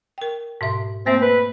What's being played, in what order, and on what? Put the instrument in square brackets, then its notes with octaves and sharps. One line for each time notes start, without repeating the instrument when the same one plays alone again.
[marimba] A#4 G5
G#2 B2 E5
[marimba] A3 A#3 E5 [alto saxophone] C4
[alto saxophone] B4